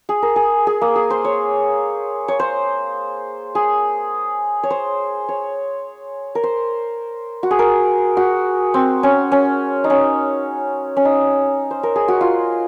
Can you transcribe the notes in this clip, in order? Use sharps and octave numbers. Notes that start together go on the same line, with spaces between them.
G#4
A#4
G#4
G#4
A#3
G#4
C5
C#5
C#5
C5
G#4
C#5
C5
C#5
A#4
C5
F#4
G#4
A#4
F#4
C4
C#4
C#4
D#4
C#4
C#4
D#4
C5
A#4
G#4
F#4
F4